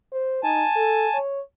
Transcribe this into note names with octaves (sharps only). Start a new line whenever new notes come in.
C5
D#4 G#5 A5
A4
C#5